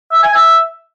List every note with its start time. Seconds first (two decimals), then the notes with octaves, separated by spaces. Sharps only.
0.12 E5
0.23 G#5
0.34 E5